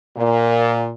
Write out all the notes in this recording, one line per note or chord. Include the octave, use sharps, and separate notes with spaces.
A#2